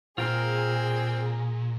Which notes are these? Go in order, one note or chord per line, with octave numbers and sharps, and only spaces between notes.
A#2 C4 F4 G#4 A#4 F6